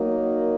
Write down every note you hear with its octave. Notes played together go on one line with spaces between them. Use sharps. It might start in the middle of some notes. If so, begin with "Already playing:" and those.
Already playing: F#3 A#3 D#4